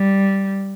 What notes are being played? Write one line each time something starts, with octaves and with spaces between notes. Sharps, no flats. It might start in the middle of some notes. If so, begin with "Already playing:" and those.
Already playing: G3